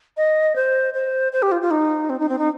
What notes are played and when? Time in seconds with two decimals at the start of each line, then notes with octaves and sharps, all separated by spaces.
0.17 D#5
0.55 C5
0.94 C5
1.32 C5
1.42 G4
1.51 F4
1.62 F4
1.71 D#4
2.10 C4
2.19 D#4
2.29 C4
2.38 D#4